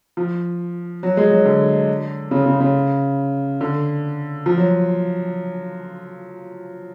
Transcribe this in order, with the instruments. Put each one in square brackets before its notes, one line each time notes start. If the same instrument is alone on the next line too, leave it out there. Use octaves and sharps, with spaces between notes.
[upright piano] F3
F#3
G#3
F#3
D3
C#3
C#3
C#3
D3
F3
F#3